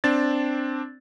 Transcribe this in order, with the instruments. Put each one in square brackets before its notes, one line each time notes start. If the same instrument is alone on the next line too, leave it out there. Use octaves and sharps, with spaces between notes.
[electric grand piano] C4 D4 A6